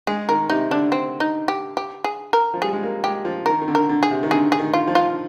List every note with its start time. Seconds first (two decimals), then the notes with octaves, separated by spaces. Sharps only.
0.07 G#3 G#4
0.29 D#3 A#4
0.50 C3 D#4
0.71 D3 D4
0.92 C4
1.20 D#4
1.48 G4
1.77 G4
2.04 G#4
2.33 A#4
2.54 F3
2.62 G3 G#4
2.73 G#3
2.83 A#3
3.04 G#3 G4
3.25 F3
3.46 D#3 A#4
3.62 D#3
3.68 D3
3.75 A#4
3.89 D3
4.03 G#4
4.11 C3
4.23 D#3
4.31 D3 G#4
4.52 G#4
4.59 D#3
4.74 F4
4.87 F3
4.95 F4